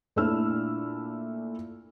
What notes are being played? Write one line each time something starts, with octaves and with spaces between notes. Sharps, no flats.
A#2 A3 D4 E4 E6 F6